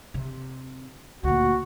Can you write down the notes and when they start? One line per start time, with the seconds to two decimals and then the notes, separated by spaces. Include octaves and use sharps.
0.14 C3
1.23 D2 A#2 F#4